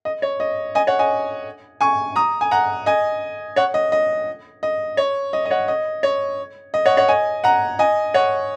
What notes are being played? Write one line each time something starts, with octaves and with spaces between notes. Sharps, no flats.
D#5
C#5
D#5
D#5 G#5
C#5 F#5
D#5 G#5
G#5 C#6
A#5 D#6
G#5
F#5 A#5
D#5 G#5
C#5 F#5
D#5
D#5
D#5
C#5
D#5
D#5
C#5 F#5
D#5
C#5
D#5
C#5 F#5
C#5 F#5
D#5 G#5
F#5 A#5
D#5 G#5
C#5 F#5